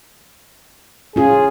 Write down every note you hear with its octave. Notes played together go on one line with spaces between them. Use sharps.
C#4 F4 G#4